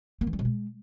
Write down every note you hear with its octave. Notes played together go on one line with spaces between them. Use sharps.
A#3
E3
G3
B2
G#3